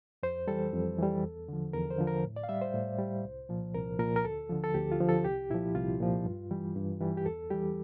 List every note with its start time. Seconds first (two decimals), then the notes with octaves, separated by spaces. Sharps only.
0.23 F2 C5
0.47 E3 G3 A4
0.73 F2
0.99 E3 G3
1.23 E2
1.48 D3 F3
1.73 E2 A#4
1.90 C5
1.98 D3 F3
2.07 A#4
2.24 A2
2.36 D5
2.44 F5
2.49 G3 E5
2.62 C5
2.74 A2
2.99 G3
3.25 C2
3.49 A#2 F3
3.74 C2 A#4
3.99 A#2 F3 A#4
4.16 A#4
4.24 D2 A4
4.49 D3 F3
4.64 A4
4.74 D2 G4
4.92 F4
5.00 D3 F3
5.09 A4
5.24 C2 G4
5.51 A#2 F3 E4
5.75 C2 F4
6.00 A#2 F3
6.25 G2
6.51 E3 G3
6.76 G2
7.01 E3 G3
7.17 G4
7.26 E2 A4
7.50 E3 G3 G4